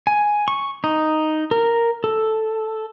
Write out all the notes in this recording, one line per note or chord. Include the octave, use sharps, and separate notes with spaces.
G#5
C#6
D#4
A#4
A4